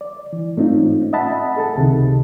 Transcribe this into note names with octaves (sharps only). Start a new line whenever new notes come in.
D5
E3
G#2 A3 C4 C#4 D#4 F4
D#5 E5 F#5 A5 B5
G#4 A4 A5
C#2 C3 D#3